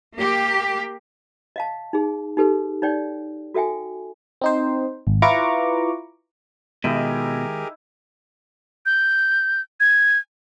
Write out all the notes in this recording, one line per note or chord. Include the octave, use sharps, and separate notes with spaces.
A#3 G4
D#5 F5 A5
D#4 G#4
D#4 G4 A4 B4
D#4 C#5 D5 G5
F#4 A4 E5 G5 G#5
C4 D#4 C5
G#1
E4 F4 B4 A#5 C#6 D6
B2 D#3 G#3 D#4 E4 G4 G#4 A#4
G6
G#6